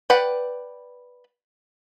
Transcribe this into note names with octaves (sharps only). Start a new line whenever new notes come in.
B4 D5 F#5 G5 B5